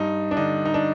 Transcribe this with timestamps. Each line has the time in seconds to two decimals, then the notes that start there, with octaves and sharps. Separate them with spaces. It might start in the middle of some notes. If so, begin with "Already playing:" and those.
Already playing: G2 D#4
0.31 D4
0.37 D3 D#4
0.65 D#4
0.74 D4